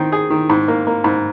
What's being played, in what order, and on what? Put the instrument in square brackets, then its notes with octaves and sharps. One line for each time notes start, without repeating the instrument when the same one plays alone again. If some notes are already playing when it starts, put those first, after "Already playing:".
Already playing: [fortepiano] D#3 C4
G#4
D#3
G#2
A#3
A#3
G#2